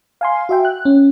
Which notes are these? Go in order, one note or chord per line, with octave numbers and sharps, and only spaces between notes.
F5 G#5 C6
F#4 E5 G5
F#6
C#4